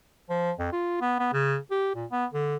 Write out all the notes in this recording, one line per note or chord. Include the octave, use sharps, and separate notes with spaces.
F3
F2
F4
B3
B3
C#3
G4
A#2
B3
D3